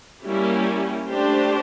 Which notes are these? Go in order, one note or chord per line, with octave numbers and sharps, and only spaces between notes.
G3 A#3 C#4 E4 G4
A3 D4 G4 C5